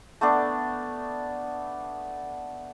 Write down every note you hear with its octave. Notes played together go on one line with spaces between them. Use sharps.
A3 B3 D4